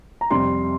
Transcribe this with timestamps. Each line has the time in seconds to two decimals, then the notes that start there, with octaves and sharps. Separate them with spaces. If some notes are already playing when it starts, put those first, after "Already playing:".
0.21 A#5
0.30 F2 C3 G3 C6